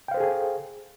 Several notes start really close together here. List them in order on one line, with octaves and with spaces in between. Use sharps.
G5 F5 C5 A4 G#4